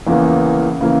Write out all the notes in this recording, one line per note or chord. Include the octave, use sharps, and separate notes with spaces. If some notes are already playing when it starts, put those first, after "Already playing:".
E2 C#3 E3 A#3
C#3 E3 A#3